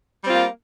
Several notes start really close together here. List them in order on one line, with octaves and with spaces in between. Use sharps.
G3 C4 F4 A#3